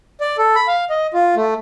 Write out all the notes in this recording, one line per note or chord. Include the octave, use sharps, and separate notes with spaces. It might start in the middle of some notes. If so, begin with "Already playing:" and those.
D5
A4
B5
F5
D#5
F4
A3